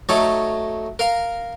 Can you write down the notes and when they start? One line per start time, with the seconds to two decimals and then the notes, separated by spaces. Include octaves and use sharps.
0.09 F#3 A3 D#4 A4 C#5 A#5
0.99 A#4 F5 A#5